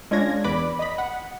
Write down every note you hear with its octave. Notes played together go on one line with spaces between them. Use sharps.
G#3 C#4 D4 F4 G#6 A#6
E2 B4 D5 B5 D6
D#5 B5
F#5